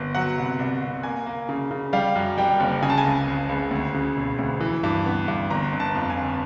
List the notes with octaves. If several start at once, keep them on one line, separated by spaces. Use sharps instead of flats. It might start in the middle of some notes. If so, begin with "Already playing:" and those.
Already playing: G1
F#3 F#5
C2
C2
C2
A#3 G#5
A#3
C#3
C#3
G3 F5
F#2
G3 G5
F#1
C#3 G#5
A5
G#5
C#2
C#2
C#2
D2
C#3
E1
D2
E3
G2
B3
G2
G1 A#5
G1
A5
F2
G#5
G1